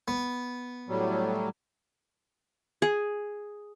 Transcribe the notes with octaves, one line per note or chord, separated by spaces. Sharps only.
B3
A2 F#3 G3
G#4